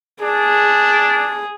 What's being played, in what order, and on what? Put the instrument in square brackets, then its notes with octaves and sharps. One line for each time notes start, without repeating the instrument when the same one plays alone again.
[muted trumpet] D4 [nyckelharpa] G#4